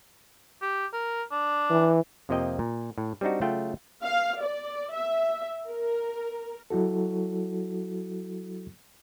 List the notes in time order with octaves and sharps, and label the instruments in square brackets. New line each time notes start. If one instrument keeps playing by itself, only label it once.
[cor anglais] G4
A#4
D4
[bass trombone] E3
[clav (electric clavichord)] F2 C3 F3 A#3 D#5 G5
A#2
A2
G3 C4 D4 D#4 F#4
C#3 F#3 A3 F4 F#5 G5
[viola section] F5
D5
E5
A#4
[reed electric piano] F#3 E4 F#4 A4